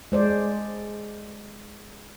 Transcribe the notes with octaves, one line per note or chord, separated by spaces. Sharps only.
G#3 C5 D5